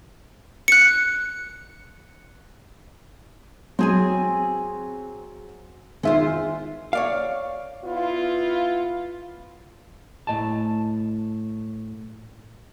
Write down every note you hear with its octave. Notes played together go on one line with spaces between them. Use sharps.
F#6 C#7
F#3 C4 G#4 G#5
D#3 G#3 F4 C5 E5
C#5 D5 F5
B3 E4 F4
A2 D#5 G#5 A5